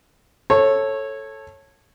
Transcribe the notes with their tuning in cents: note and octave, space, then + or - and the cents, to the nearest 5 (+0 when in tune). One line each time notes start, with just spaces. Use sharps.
A4 +0 C#5 -20